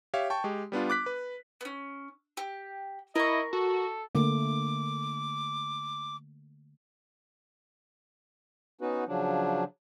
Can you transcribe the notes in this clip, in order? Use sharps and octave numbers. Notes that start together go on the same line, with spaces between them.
G4 C#5 E5 F5
G5 A5 C#6
G#3 G4
G3 B3 D4 F4
D6 F#6 B6
B4
B3 C#4
G4
E4 A#4 D#5 C#6
F#4 A4
D3 A3 A#3 D6
B3 C#4 D#4 F#4 B4
C#3 F3 F#3 D4